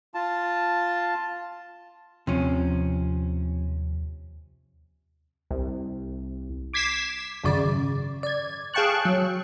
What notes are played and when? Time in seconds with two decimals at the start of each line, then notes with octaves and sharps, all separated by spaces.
0.14 F4 A5
2.27 D#2 C3 F3 C#4
5.51 C2
6.74 D6 G#6 B6 C7 E7
7.44 G#1 F#2 C#3 D5
8.23 D5 G#6
8.74 G#4 F5 G5 A5 C#6 F#6
9.05 F#3